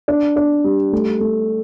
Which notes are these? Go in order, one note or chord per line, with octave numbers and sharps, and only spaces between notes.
D4
D4
G3
A3
A3